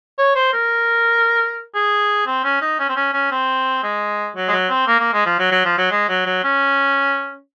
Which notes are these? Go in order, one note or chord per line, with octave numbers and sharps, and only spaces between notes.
C#5
C5
A#4
G#4
C4
C#4
D#4
C#4
C4
C#4
C#4
C4
G#3
F#3
G#3
F#3
C4
A#3
A#3
G#3
F3
F#3
F#3
F3
F#3
G#3
F#3
F#3
C#4